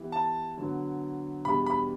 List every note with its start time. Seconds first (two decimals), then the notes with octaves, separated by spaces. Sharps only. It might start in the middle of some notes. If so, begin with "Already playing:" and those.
Already playing: E3 B3 E4 G4
0.12 A5
0.57 D3 F#3 B3
1.45 E2 B2 G3 D4 G4 B5
1.66 B5